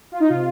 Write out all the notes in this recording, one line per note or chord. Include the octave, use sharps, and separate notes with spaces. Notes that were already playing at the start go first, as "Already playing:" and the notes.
F4
D#4
C3 F4